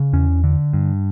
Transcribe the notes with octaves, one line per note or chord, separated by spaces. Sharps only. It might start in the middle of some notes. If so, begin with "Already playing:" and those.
Already playing: C#3
E2 C#4
D3
G2